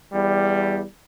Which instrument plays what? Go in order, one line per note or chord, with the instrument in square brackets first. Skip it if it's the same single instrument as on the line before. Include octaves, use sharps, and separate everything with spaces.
[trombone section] E2 G3